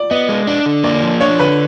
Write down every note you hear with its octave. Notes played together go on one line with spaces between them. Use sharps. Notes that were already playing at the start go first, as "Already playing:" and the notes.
Already playing: D5
B3 D#5
G#3
D4
D3
A#3 D5
F3
D4 C#5
D3 B4